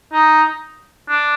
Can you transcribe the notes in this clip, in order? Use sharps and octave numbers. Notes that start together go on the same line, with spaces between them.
D#4
D4